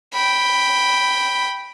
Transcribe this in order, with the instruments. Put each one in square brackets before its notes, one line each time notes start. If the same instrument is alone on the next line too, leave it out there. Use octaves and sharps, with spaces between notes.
[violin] G5 B5